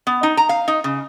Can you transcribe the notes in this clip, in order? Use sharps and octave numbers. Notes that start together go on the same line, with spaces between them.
B3
D#4
A#5
F5
D#4
C#3